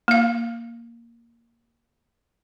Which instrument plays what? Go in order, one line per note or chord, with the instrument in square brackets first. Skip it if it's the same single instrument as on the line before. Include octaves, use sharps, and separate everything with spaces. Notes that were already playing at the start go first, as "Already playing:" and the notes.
[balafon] A#3 F5